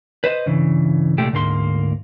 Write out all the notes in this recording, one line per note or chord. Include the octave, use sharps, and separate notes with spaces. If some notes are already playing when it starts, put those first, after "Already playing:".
B4 C5 D#5
G2 C#3 E3
C2 A#2 G#3 A3 G4
D2 G#2 A#3 C6